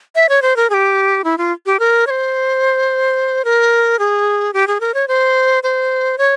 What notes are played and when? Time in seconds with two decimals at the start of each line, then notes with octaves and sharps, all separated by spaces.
0.15 E5
0.29 C#5
0.42 C5
0.56 A#4
0.70 G#4
0.74 G4
1.24 E4
1.38 F4
1.66 G4
1.80 A#4
2.07 C#5
2.10 C5
3.45 A#4
3.99 G#4
4.54 G4
4.67 G#4
4.81 A#4
4.94 C#5
5.08 C5
5.63 C5
6.18 C#5